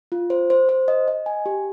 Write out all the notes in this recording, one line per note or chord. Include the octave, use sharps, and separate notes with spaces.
F4
C5
C5
C5
D#5
D#5
G#5
G4